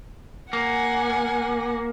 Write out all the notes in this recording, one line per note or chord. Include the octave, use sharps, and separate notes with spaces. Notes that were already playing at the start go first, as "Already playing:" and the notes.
A#3 F#5 G#5